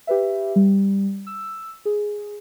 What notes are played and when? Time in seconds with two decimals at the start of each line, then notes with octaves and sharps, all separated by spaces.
0.07 G4 B4 E5
0.56 G3
1.27 E6
1.85 G#4